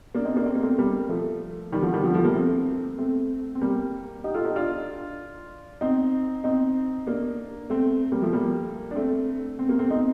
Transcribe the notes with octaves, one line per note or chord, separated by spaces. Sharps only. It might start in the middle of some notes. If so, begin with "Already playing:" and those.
A#3 D4
C4 D#4
A#3 D4
C4
A#3
A3 C4
G3 A#3
F3 A3
D#3 G3
D3 F3
D#3 G3
D3 F3
F3 A3
G3 A#3
A3 C4
A3 C4
C4
G3 A#3
D#4 G4
F4 A4
D#4 G4
D4 F4
C4 D#4
C4 D#4
A#3 D4
A3 C4
G3 A#3
F3 A3
G3 A#3
D4
A3 C4
C4
A#3
A3 C4
C4 D#4